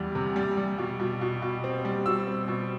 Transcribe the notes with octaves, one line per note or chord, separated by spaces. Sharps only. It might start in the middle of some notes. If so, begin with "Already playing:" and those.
Already playing: E2 E3 G3
C3
G3
G3
B2
B2
B2
B2
C4
G3
B2 E6
C4
B2